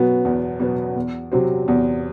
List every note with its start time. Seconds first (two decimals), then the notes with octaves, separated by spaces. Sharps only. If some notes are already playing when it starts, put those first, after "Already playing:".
Already playing: B2 F#3 B3
0.25 E2
0.60 B2 F#3 B3
0.96 E2
1.32 C3 F#3 C4
1.68 E2